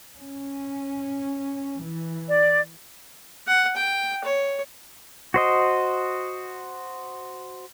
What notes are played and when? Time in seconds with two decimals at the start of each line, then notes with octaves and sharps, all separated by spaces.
0.16 C#4
1.82 E3
2.27 D5
3.47 F#5
3.76 G5
4.24 C#5
5.34 F#4 C5 D#5